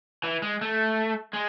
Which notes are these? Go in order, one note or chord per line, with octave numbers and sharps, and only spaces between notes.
E3
G#3
A3
G#3